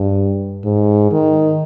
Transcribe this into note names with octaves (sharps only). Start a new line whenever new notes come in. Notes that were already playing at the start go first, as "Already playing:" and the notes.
Already playing: G2
G#2
D#3